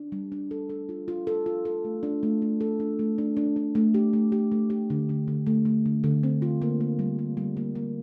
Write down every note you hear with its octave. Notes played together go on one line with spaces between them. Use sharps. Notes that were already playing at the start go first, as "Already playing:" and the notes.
Already playing: D4
G3
D4
A4
A4
F4
F4
A4
F4
A4
A3
D4
A3
A3
A4
D4
A3
D4
D4
D4
A3
G4
A3
G4
A3
G4
D3
D3
D3
A3
A3
D3
D3
C4
F4
A#3
A#3
G3
G3
G3
A#3
A#3